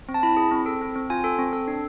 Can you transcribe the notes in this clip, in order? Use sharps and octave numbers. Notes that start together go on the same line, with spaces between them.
C4
A5
E4 B5
G#4
C4
A4
C4
C4
F4 G#5
A4
C4
A4
D4